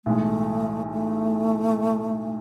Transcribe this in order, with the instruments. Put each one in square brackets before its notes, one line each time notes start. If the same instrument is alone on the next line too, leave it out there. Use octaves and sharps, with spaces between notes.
[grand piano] B1 A2 E3 G#3 [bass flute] A3
[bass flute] A3